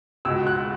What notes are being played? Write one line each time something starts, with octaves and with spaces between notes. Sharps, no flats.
C#2 B2 G#3 E6
F#6